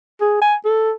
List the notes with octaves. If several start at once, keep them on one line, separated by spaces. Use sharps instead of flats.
G#4
G#5
A4